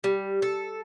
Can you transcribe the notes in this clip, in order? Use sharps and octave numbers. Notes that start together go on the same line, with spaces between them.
G3
A4